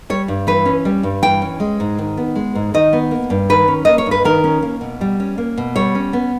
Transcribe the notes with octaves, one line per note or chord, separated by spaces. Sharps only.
G3 C#5
G2
E3 B4
C#4
G3
G2
E3 G5
C#4
G#3
G#2
D#3
B3
G#3
G#2
D#3 D#5
B3
A#3
G2
D#3 B4
C#4
A#3 D#5
C#5
G2
B4
D#3 A#4
C#4
A#3
B2
G3
C#4
A#3
B2
G3 C#5
C#4
B3